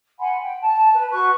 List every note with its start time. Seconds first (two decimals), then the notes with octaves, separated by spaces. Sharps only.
0.19 F#5 G#5 B5 C6
0.41 G5
0.61 A5
0.95 B4
1.11 F#4 B4 C#6 F#6